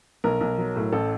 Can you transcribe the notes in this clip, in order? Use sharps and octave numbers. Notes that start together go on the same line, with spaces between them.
B1 A#4
B1
F#3
A2
A1 A4